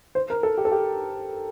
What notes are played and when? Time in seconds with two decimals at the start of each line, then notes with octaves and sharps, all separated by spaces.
0.15 C5
0.30 A#4
0.43 A4
0.58 G4
0.65 A4
0.71 G4